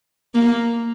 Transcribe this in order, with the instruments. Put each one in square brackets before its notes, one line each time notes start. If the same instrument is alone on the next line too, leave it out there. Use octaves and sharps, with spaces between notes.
[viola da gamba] A#3